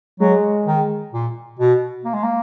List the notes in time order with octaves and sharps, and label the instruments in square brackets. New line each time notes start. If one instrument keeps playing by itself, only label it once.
[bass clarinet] F#3 [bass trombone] G#3
[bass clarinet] D#3
A#2
B2
A#3
G#3
A#3